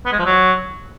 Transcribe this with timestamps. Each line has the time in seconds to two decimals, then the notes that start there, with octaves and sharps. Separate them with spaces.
0.06 B3
0.12 G#3
0.19 F3
0.26 F#3